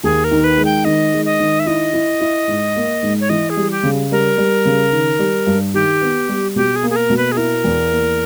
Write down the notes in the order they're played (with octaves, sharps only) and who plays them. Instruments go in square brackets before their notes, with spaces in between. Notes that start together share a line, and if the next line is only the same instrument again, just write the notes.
[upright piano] D#2 [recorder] G#4
[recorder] A#4
[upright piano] D#3
[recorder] B4
[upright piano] G#3
[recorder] G5
[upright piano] D#3 [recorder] D#5
[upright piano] G#3
[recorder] D#5
[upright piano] D#3
[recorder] E5
[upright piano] E4 [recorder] D#5
[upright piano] E4
E4
G#2
A#3
G#2
[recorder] C#5
[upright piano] E3 [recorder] D#5
[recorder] G#4
[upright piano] G3
[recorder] G4
[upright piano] C#3
[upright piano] G3 [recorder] A#4
[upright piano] G3
C#3
D#3
G3
G2
[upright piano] D#3 [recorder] G4
[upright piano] B3
G3
[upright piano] B2 [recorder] G4
[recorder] G#4
[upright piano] A#3
[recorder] G#4
A#4
[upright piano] B2
[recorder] B4
G#4
[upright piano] E4 [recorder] A#4
[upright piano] E2
A#3